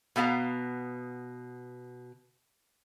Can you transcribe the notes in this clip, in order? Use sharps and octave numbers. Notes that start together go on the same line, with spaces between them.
B2 B3 F5 A5 A#5